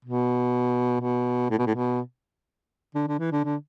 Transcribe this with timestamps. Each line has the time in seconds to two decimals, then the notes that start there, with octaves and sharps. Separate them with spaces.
0.05 B2
1.01 B2
1.50 A2
1.58 B2
1.67 A2
1.75 B2
2.95 D3
3.08 D3
3.19 E3
3.32 D3
3.44 D3